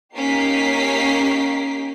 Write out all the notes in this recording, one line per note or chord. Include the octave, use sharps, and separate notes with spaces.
A#3 C#4 D#4 G4 B6 C7